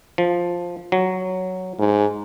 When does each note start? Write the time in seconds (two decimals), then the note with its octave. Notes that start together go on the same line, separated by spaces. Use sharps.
0.18 F3
0.92 F#3
1.79 G#2